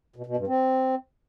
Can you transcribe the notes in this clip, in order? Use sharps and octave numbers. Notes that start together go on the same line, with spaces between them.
B2
B2
G2
C4